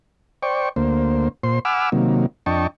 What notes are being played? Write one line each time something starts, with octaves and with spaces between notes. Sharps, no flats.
C5 D5 G5 C#6
D2 A#3 C5
A#2 C5 C6
F#5 G#5 B5 D6 E6 F6
C3 D#3 F#3 A#3
F2 D4 D#5 G5 A5 C#6